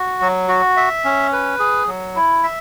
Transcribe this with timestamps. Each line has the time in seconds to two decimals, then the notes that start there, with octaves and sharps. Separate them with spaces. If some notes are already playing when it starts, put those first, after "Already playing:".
Already playing: F#4
0.21 F#3
0.49 F#4
0.77 E5
1.05 C#4
1.32 B4
1.59 G#4
1.87 F#3
2.16 E4
2.44 E5